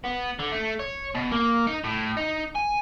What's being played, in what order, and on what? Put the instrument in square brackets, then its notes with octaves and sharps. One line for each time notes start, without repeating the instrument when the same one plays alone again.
[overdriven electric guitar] B3
D3
A3
C#5
B2
A#3
D#4
A2
D#4
G#5